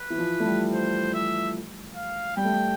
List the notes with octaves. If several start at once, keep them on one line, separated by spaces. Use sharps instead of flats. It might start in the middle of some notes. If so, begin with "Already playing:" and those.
Already playing: B4
E3
F3
A3
G3
C5
E5
F5
G3 G5
A3
G3